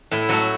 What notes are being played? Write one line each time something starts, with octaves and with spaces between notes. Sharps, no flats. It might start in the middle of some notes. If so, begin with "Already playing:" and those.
A2 E4
F#3 A3 F#4